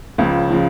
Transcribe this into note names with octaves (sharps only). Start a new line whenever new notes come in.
C#2 C#3 F3
C#3 F3